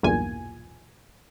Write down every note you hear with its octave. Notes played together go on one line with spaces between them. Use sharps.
B1 E2 G2 A#2 G#5